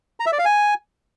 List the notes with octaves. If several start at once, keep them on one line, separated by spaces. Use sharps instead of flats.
A#5
E5
D5
F5
G#5